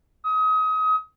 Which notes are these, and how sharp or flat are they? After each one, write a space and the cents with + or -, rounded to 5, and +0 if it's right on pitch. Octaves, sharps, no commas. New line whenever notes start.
D#6 +30